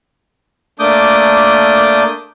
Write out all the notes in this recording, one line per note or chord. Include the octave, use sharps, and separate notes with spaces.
A3 A#3 D4 D6 D#6 G6